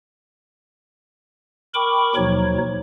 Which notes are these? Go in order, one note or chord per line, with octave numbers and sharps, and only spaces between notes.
A#4 G5 B5 C#6 D6
D#2 B2 F3 F#3 D#4 C#5